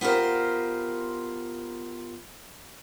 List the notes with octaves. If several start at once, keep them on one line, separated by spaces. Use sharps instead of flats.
B3 F4 G4 A#4 C5